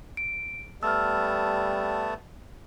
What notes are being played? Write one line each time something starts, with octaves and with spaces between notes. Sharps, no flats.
D7
G3 A3 B3 A5 E6 F6